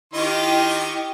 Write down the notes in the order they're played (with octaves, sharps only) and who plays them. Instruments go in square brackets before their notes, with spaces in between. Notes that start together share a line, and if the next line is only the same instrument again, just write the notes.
[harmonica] D#3 F4 C#6 [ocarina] E4 [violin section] G4 D#5